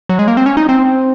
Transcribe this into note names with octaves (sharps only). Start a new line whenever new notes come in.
F#3
G#3
A#3
C4
C#4
D#4
C4